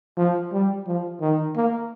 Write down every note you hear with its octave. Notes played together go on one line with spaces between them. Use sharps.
F3
G3
F3
D#3
A#3